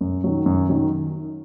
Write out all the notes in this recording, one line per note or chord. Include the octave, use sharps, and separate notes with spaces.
F#2
D#3 F#3
F#2
D#3 F#3